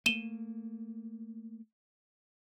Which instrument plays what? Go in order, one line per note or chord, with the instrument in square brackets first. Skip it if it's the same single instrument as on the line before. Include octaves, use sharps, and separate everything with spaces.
[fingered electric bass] A3 A#3 [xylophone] D#7 E7 G7